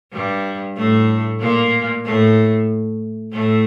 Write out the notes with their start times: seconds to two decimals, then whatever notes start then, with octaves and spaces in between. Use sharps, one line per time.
0.13 G2 G3
0.77 A2 A3
1.41 A#2 A#3
2.05 A2 A3
3.33 A2 A3